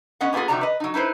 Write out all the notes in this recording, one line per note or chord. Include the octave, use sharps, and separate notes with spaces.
B3 C#4 D#5 F#5
A#3 B3 E4 F4 G#4
C3 D#3 F3 F#4 D5 A#5
B4 D#5
F#3 D#4
D#4 E4 B4 C5